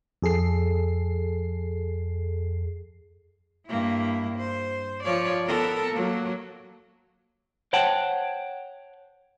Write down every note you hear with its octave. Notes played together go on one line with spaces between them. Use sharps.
F2 G#4 A4 C7
G2 A#3 E4
C5
F3 C#5 D5
B3 A4 A#4
F#3 A#3
C5 C#5 F#5 G5 A5